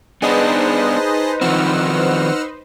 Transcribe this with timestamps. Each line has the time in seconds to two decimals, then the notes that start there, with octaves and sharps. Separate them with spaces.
0.22 B3 D4 D#4 G#4 B4 C5 D#5 A5
1.41 D#3 F3 C4 F#5 E6 F6